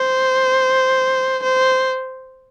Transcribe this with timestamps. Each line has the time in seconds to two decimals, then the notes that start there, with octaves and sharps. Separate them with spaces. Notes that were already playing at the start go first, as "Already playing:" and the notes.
Already playing: C5
1.43 C5